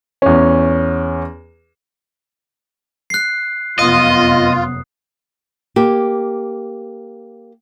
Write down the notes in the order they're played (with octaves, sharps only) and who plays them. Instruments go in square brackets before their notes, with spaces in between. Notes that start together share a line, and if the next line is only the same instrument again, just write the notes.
[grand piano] E2 C#4
[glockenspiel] F#6 C7
[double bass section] F1 F#2 B3 [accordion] F4 [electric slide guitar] D#5 [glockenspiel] D#6
[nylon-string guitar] A#3 G4